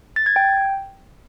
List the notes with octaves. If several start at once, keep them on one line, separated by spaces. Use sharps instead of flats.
A6
G#6
G5